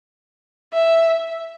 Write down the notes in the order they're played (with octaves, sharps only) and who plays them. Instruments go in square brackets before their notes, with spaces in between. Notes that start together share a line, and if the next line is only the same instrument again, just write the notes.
[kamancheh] E5